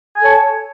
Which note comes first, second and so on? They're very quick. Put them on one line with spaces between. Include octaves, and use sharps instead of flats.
G#5 A4 A5 C#5